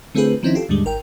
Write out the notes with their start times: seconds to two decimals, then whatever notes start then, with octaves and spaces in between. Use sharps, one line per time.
0.15 D3 A3 C4 F4 G#4 B4
0.43 D#3 F3 C4 C#4 D#4 E4
0.55 F4 G4 A4
0.69 D#2 G#2 D3 G3 G#3
0.85 G#1 A#4 G5